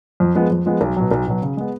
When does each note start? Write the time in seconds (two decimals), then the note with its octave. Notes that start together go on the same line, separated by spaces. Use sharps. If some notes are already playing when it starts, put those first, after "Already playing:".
0.20 F2
0.35 F3 G#3 B3
0.50 F2
0.66 F3 G#3 B3
0.81 B1
0.96 B2 F#3
1.11 B1
1.27 B2 F#3
1.42 C#3
1.57 G#3 B3